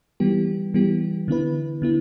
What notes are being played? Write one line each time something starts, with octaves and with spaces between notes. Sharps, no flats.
E3 G3 B3 G4
E3 G3 B3 G4
D3 B3 E4 B4
D3 B3 E4